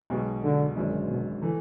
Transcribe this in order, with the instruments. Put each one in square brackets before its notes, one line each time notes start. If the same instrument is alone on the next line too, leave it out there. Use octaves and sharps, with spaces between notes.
[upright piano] B1 B2 G#3
[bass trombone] D3
[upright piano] G#1 F#2 D3 G#3
[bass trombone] B2
[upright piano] E3 A3